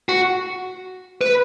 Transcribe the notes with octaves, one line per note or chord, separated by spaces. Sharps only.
F#4
B4